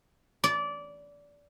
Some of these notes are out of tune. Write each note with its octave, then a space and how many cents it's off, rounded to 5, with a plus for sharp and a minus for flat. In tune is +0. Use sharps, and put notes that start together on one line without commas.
D5 -20